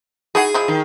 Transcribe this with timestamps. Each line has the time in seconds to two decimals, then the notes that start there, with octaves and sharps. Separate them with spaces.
0.35 D#4 E4 F#4 G#4
0.54 F3 G#3 E4
0.68 D#3